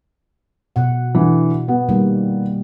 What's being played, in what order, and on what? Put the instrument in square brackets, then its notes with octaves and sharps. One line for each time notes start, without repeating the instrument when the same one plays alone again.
[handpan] B2 F#5
[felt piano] D3 E3
B3
[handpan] D#3 G3 A#3